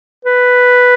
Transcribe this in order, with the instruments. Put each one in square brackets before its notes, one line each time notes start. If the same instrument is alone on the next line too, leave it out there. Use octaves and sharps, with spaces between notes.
[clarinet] B4